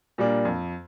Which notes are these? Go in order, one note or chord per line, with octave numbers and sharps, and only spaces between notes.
A#2 G3 A#3 D4
F2